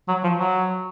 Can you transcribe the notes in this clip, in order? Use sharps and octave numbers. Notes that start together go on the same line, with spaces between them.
F#3
F3
F#3